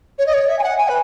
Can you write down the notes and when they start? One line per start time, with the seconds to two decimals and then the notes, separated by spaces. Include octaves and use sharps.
0.18 C#5
0.26 D#5
0.33 C#5
0.48 E5
0.58 G#5
0.63 F#5
0.77 G#5
0.88 B4